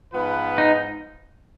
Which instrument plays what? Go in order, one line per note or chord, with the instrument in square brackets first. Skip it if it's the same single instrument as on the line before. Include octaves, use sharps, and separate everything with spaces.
[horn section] G#2 F3 B3 F4 B4
[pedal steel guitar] D#4